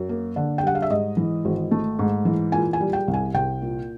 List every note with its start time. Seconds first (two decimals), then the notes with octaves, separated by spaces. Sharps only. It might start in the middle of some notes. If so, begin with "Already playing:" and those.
Already playing: F#2
0.09 A#3
0.36 D3
0.58 G5
0.63 G3 F#5
0.75 F5
0.82 E5
0.90 G#2 D#5
1.17 E3
1.45 G#1
1.71 A3
1.99 G#2
2.25 E3
2.52 A#2 G#5
2.73 G#5
2.81 G3
2.93 G5
3.08 C2
3.14 G#5
3.34 C2 G5
3.62 A#2